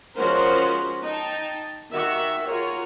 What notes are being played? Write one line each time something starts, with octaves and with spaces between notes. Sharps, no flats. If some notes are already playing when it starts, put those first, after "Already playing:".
F3 G#3 C#4 F#4 A#4 C5
D#4 G5 A5
D#3 F#4 G4 E5
F4 F#4 G#4 A#4 C#5